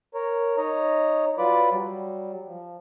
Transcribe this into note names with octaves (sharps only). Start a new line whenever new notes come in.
A#4 C#5
D#4 C#5 D#5 A#5
F#3 F4 B4 D5 B5 D6
F#3 G3
F3